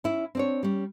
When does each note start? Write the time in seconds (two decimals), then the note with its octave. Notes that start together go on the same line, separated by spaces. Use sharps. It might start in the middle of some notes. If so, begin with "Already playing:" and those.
0.04 C#4 E4
0.35 C4 D4 C#5
0.63 G3 C#4